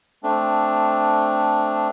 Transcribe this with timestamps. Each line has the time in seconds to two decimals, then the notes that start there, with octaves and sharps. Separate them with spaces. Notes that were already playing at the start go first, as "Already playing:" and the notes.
0.23 A3 C4 D4